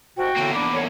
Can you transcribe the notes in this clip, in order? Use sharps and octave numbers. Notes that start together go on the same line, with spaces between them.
C2 G#2 B2 F#4 G5
E2 A2 D3 A#3
D4 B5 D6
C2 D3 C#5